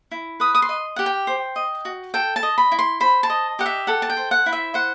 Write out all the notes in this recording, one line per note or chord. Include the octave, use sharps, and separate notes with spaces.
E4
B4 D#6
D#6
C6
D#5
G4 F#5
G5
C5
D#5
F#4
A4 G5
A5
D#5
B5
E4
C6
C5 B5
A5
D#5
G4 F#5
E5
A4 F#5
A5
G5
C5
F#5
E4
E5
C5 F#5